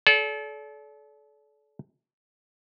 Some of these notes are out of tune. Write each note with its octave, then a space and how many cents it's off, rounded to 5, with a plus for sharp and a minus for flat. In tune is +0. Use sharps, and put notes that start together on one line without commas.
A4 -35 D5 -35